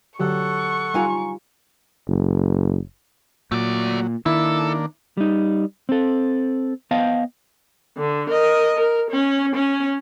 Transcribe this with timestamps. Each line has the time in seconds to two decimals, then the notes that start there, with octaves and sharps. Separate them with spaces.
0.20 D3 F#3 G4 A4 F#5 C#6
0.94 G3 D#4 F4 F5 G#5 A#5
2.08 F#1
3.52 A#2 F#3 A3 D5
4.26 D#3 A#3 D4 E4 A4
5.17 G3 D#4
5.89 C4 A4
6.91 B3 C5 D#5 F5 G5 A5
7.98 D3
8.30 A#4 D#5
8.77 A#4
9.11 C#4
9.55 C#4